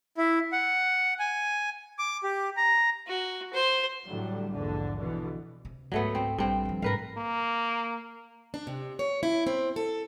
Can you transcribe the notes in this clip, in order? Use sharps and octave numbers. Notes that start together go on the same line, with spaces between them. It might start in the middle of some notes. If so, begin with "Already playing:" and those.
E4
F#5
G#5
D6
G4
A#5
F#4
C5
A2 D3 F#3 G3
A#1 E2 G#2 D3
B2 D3 E3
C3
G#1 C#2 F#3 A3 B3
C4
A#1 G2 C4
D#3 F3
G#2 C3 A#4 B4 F5
A#3
D4
C3
C#5
E4
C4
A4